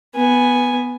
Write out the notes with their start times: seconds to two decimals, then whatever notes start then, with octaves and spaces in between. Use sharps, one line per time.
0.15 B3 G#5